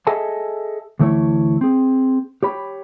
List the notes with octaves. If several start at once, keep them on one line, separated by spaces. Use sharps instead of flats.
G#4 A4 D#5 E5 G#5 A5
D2 E3 A3 E4 C#5
C4 G#4
G4 C#5 B5